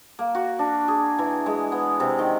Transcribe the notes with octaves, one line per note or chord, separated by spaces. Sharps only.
A#3
F#4
D4
G#4
E3
G#3
B3
C3
D#3